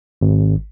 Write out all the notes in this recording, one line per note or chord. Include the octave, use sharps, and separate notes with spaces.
G#1